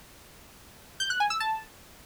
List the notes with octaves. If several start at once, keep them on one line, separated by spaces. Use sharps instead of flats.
G6
F#6
G#5
E6
A5